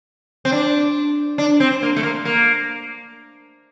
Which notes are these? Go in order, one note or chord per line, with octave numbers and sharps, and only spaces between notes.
C4
D4
D4
C4
A#3
A3
A#3
A#3